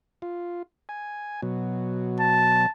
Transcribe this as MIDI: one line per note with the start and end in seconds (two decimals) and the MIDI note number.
0.22 0.62 65
0.89 1.41 80
1.42 2.66 47
1.42 2.66 54
2.20 2.70 81